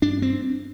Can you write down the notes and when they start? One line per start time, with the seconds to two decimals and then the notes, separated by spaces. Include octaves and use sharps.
0.02 G2 D4
0.22 C4